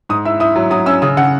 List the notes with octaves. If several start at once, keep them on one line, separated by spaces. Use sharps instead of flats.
G#2 D#6
E4 E6
E4 D#6
F#3
F#3 D#6
C#4 E6
C#3 D#6
C#3 F#5